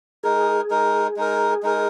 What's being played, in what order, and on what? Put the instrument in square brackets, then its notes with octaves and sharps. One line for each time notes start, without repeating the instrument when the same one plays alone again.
[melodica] G#3 D#4 A#4 [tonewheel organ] G#4
[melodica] G#3 D#4 A#4
G#3 D#4 A#4
G#3 D#4 A#4